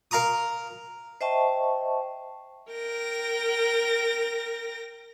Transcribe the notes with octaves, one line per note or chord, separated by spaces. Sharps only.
A#4 F5 A#5 C#6 D#6
C5 D#5 E5 G5 A5 C#6
A#4 G5 A#6